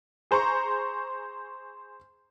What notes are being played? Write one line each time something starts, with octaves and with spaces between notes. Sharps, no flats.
G#4 C5 A#5 C#6